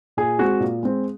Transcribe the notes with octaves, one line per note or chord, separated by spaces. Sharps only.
A#2 G#4
G#3 C4 F#4
A#2
G#3 C4